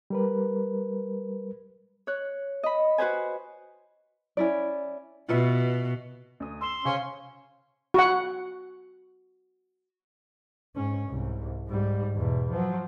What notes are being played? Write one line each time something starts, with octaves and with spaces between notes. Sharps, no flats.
G3 A#4 B4
C#5 F#6
D#5 B5
F#4 B4 C5 G#5
C#4 E4 D5
B2 F4 B4 E5
D2 D#6
C6 E6 E7
C#3 C#4 C5 F5
F#4 F#5
G#2 C#4
C2 G#2
G#2 G3
E2 B2
F3 F#3